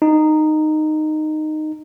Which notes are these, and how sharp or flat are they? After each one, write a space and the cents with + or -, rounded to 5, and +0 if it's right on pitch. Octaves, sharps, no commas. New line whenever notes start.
D#4 -10